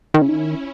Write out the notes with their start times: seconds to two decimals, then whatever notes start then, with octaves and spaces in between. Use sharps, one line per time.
0.14 D#3 C#4 E4
0.22 C#3
0.29 D#3